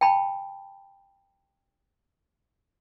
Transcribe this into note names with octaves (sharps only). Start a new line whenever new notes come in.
G5 A5 B5